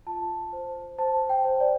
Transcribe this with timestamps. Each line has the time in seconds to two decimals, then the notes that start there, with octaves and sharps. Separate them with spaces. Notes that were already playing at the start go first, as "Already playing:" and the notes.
0.06 F4 A5
0.53 C5
0.98 C5 A5
1.29 G5
1.45 C5
1.60 D5